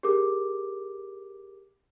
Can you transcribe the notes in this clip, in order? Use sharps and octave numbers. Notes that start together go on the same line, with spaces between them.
G4 G#4 A#4 D6